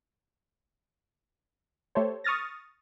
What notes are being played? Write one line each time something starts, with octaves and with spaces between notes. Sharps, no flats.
A3 G4 A4 C5 C#5
C#6 D#6 F6 A6 A#6